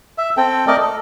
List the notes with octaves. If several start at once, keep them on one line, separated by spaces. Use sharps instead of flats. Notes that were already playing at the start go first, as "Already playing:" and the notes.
E5
C4 A4 G5
A3 A#4 D5 D#5
A4